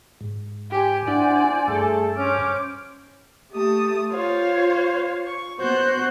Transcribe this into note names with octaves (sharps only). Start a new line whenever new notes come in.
G#2
G4 C5 G#5
D4 E4 D5 F#5
G2 A3 G#4 A4
C#4 C5 C#5 D6 F6
A3 G4 A5 D#6
F4 C5 C#5 F5
C#6
B3 F#4 C5 F#6 G6